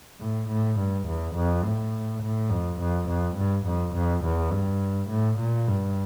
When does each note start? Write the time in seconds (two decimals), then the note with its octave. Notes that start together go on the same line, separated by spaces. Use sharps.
0.20 A2
0.49 A2
0.79 G2
1.07 E2
1.35 F2
1.64 A2
2.22 A2
2.51 F2
2.80 F2
3.08 F2
3.36 G2
3.66 F2
3.94 F2
4.24 E2
4.52 G2
5.09 A2
5.39 A#2
5.68 G2